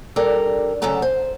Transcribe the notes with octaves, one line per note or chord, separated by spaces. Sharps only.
G3 D4 A4 A#4
D2 C#3 F#3 A4 A5 A#5
C5